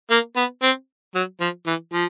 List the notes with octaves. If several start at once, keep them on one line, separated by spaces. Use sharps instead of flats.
A#3
B3
C4
F#3
F3
E3
F3